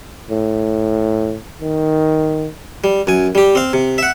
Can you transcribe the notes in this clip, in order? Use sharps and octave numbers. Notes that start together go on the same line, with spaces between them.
A2
D#3
G3
F#2 G#5
G3 G4
C4 F5
C3
E5 F#5